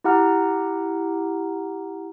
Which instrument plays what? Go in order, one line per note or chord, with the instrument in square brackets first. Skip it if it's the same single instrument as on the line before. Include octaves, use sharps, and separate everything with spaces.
[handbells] E4 G4 F#5 A#5 F6